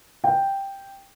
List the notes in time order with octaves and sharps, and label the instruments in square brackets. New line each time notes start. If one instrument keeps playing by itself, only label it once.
[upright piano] G5